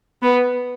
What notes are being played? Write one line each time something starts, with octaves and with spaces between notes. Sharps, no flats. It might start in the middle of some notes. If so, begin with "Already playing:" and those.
B3